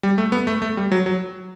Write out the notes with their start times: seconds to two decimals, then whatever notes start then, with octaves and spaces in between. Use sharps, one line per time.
0.03 G3
0.18 A3
0.32 B3
0.47 A3
0.62 A3
0.77 G3
0.92 F#3
1.06 F#3